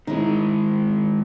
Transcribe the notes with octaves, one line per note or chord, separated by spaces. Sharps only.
D#3 G#3 D#4 E4